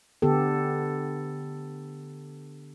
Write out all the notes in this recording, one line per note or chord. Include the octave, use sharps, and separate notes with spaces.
D3 B3 G4 A4